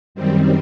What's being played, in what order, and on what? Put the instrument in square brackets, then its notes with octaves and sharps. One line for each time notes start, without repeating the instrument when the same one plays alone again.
[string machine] F#2 D#3 G3 C4